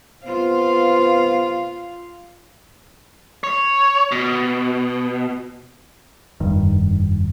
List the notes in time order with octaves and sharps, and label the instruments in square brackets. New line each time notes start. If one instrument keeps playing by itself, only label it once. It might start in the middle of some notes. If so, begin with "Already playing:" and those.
[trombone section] C3 B3 C5 [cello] F4 F5
[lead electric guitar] C#5
B2
[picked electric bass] F1 G2 D#3